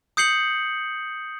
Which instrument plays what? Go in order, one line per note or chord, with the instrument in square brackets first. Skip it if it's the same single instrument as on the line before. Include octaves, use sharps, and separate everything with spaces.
[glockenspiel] D#6 G6 C7 C#7 F#7